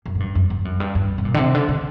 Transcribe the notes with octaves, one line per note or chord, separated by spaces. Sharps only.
F#2
A2
G2
F#2
G2
F#2
G2
G2
C3
A#2
D3
C3
D3
D3